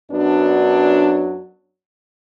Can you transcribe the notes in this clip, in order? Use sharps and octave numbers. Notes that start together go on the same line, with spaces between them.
F#2 F#3 B3 D4